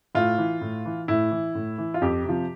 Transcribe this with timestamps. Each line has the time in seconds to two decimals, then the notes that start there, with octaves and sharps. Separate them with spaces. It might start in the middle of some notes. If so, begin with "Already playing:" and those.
0.15 A2 F4
0.38 E3
0.61 A2
0.85 E3
1.08 A2 E4
1.31 E3
1.55 A2
1.78 E3
1.94 F4
2.02 F2 G4
2.25 C3 F3